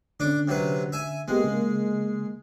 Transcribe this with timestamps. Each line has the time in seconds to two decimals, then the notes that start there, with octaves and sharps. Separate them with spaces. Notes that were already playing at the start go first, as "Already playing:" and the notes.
0.20 D3 C#4 D4 D6
0.48 C3 F#3 B4
0.92 E5 G#5
1.28 G#3 A#3 B3 G4
1.44 C#3 A#3